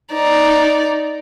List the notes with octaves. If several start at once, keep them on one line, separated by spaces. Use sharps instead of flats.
D#4 D5